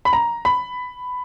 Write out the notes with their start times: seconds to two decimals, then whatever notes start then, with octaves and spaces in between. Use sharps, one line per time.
0.05 B5
0.13 A#5
0.45 B5